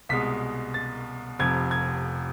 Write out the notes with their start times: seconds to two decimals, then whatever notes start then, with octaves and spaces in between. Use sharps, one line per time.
0.09 C2 B2 G#3 B6
0.74 A6
1.39 F1 F2 C3 G#6
1.71 G#6